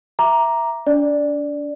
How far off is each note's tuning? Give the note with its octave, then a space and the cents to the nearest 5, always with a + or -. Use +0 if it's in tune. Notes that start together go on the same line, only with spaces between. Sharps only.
E5 +5 A#5 +5 D6 +0
D4 -35 D5 +0